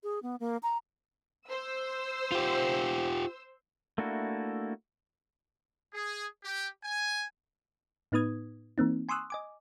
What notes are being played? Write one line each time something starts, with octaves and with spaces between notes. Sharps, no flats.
G#4
B3
A#3
A#5
C5 E6
F4 G4
A3 A#3 D4 E4 F#4
G#4
G4
G#5
A2 B3 D#4 B4 D#6 G#6
E3 A#3 C4 D#4
G#5 C6 C#6 D#6 E6 F#6
D#5 G#5 D6